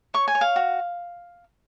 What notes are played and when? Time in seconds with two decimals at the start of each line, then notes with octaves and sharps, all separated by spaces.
0.14 C#5 C#6
0.28 G#5
0.35 C#5
0.41 F5
0.56 F#4